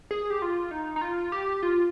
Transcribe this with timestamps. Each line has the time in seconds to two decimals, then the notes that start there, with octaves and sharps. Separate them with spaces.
0.11 G#4
0.30 G4
0.42 F4
0.71 D#4
0.96 D#4
1.01 F4
1.32 G4
1.63 F4